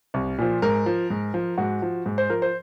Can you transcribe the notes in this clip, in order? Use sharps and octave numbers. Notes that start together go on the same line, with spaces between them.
C2
A#2 F3
G#2 A#4
F3
G#2
F3
G#2 F#4
F3
G#2
C5
F3 A#4
C5